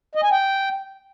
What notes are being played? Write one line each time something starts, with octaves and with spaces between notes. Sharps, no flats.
D#5
G#5
G5